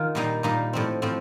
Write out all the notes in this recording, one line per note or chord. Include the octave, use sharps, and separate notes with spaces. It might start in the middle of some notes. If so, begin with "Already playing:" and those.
Already playing: D#3 F4
A#2 G3 A#3 D#4
A#2 G3 A#3 D#4
A2 F3 C4
A2 F3 C4